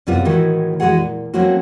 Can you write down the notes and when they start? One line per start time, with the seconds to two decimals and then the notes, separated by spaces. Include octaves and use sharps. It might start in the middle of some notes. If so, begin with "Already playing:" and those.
0.07 F#2 C3 G3 B3 F4 E5
0.25 A2 D#3 E3 G#3 F#4 E5
0.80 E3 G#3 A3 F#4 G#4 F#5
0.98 A#2
1.34 F#3 A3 A#3 C4 C#4 F#4